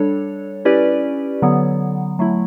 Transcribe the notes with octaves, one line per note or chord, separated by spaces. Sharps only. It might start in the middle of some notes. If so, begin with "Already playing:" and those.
Already playing: G3 D4 A4 C#5
C#4 E4 G4 B4 D5
D3 F#3 B3
F#3 A3 E4